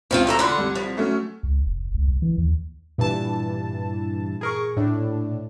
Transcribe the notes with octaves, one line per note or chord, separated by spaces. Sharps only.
C#2 F3 C4 F4
D2 A4 A#5
D3 F4 F#5 B5 C6
C2 G3
F3
F#3 A3 C#4
C#2
F1
C#2
C2
E3
D#2
G2 A#2 E3 A5
G#4 A#4 C#6
A2 D4